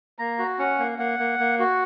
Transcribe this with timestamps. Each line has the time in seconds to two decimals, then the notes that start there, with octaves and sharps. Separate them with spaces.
0.19 A#3 A#5
0.39 F#4
0.59 C#4 F#5
0.79 A#3
0.99 A#3 F#5
1.19 A#3
1.39 A#3
1.59 F#4